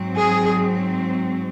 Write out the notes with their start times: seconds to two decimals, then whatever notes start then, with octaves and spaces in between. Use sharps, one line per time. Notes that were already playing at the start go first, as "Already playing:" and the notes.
Already playing: G#2 F#3 C4
0.16 G#4